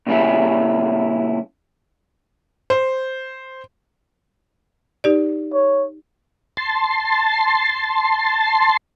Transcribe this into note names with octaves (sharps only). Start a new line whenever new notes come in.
A#2 C#3 G3 C#4 E4
C5
D#4 G4 D5
C#5
A5 C6